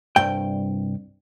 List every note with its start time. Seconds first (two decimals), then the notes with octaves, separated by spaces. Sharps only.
0.16 C2 G2 G5